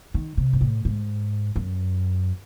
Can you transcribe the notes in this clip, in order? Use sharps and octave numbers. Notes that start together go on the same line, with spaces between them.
D#3
C3
G#2
A2
G#2
F#2